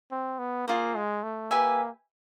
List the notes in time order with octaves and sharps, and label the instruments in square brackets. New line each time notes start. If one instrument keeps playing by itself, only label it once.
[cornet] C4
B3
[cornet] A#3 [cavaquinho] F4 G#4 C5
[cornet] G#3
A3
[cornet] A#3 [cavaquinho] G4 B4 E5 G#5